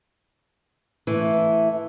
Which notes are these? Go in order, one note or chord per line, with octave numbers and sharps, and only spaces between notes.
E3 A3